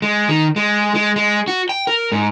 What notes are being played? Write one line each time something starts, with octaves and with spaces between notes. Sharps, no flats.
G#3
D#3
G#3
G#3
G#3
F#4
G5
A#4
G#2